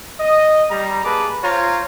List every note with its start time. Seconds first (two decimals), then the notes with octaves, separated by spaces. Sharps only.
0.20 D#5
0.71 G3 A#5
1.05 A#3 G#4 B4 A5 D6
1.43 F4 C5 C#5 A#5